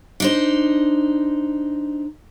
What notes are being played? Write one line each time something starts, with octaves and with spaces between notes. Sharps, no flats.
D4 D#4 C5